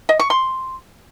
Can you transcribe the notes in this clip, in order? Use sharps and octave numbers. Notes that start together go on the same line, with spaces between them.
D#5
C#6
C6